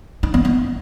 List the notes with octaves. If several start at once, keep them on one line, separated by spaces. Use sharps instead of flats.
D#4
B3
B3